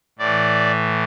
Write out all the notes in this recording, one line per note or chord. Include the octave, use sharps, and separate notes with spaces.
A2 E3 D5